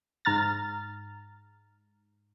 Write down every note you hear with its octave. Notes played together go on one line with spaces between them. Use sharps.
G#2 A#5 F6 A6